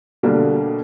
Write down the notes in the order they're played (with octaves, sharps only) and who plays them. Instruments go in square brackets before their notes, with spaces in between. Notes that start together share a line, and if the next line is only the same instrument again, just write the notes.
[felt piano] B2 D3 G3 A#3